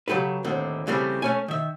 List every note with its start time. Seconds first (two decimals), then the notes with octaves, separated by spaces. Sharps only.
0.08 C#3 F#3 G4 A4 B4
0.44 D#2 A2 D3 C4
0.87 C#3 E3 G3 A3 C4
1.22 A3 C#4 G#5
1.48 D#3 E5